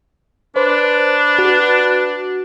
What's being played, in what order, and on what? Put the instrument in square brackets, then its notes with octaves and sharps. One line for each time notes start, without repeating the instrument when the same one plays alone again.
[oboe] D4 [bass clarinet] B4 [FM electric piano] C5
[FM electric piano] F#4